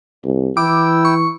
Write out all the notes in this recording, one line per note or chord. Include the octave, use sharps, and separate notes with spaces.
C2
E3 E4 G5 D6 E6
C#6